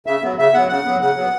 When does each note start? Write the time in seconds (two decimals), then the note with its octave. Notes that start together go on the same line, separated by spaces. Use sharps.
0.07 C#3 E5
0.23 F#3 B3
0.38 C#3 E5
0.54 F#3 B3 F#5
0.69 C#3 F#5
0.85 F#3 B3
1.01 C#3 F#5
1.16 F#3 B3